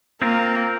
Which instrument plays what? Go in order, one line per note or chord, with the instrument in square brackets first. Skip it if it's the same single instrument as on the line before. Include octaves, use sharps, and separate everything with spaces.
[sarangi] A#3 [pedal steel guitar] C4 F4 A#4